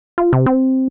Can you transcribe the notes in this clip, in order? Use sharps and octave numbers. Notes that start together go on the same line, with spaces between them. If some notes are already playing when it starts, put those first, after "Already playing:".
F4
C3
C4